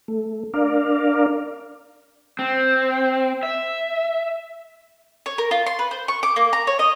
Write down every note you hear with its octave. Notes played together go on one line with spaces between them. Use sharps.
A3
D4 A#4 D5 F5
C4
E5
C#5
A#4
F4
C6
B4
C5
C#6
D6
A#3
A#5
C#5
D#5